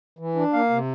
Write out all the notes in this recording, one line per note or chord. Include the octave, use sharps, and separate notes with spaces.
E3
D4
A#3 F5
C3